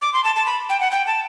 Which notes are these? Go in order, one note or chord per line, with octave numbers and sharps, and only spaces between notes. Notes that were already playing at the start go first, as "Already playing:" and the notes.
D6
C6
A5
A5
B5
G5
F#5
G5
A5